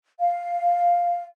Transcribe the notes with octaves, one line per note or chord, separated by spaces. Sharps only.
F5